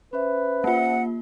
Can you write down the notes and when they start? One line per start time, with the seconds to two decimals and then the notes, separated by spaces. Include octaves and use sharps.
0.13 C#4 B4 C5 E5
0.64 A#3 F4 F#5